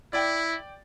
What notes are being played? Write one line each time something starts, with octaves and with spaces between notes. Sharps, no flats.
E4 D5 G5